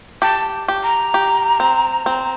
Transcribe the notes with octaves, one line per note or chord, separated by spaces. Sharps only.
G4 A5
G4
A#5
G4
C4
C4